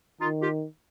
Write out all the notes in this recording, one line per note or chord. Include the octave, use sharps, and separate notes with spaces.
D#3 D#4 F4
F4 G4